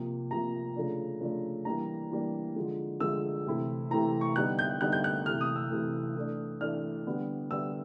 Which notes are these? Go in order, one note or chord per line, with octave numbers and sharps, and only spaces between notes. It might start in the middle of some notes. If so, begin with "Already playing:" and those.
Already playing: C3 F3 A#3
C3 F3 A#3 A#5
C#3 F3 A3 D4
C#3 F3 A3 D4
E3 G3 A#3 D4 A#5
E3 G3 A#3 D4
D3 F3 G#3
D3 F3 G#3 E6
C3 E3 A3 C4 E4
C3 E3 A3 C4 E4 A#5
C#6
D3 G3 B3 D#4 F#6
G6
D3 G3 B3 D#4 F#6
G6
F#6
C3 E3 A3 F6
D#6
E6
C3 E3 A3
E3 A3 D4
E3 A3 D4 F6
D3 G3 B3 D4
D3 G3 B3 D4 E6